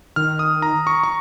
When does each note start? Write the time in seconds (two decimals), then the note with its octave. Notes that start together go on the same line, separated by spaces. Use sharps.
0.16 D#3 F6
0.39 D#6
0.62 A#5
0.87 C#6
1.04 C#6